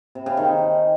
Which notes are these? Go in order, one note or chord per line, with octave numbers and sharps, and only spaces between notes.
C3
C#3
D#3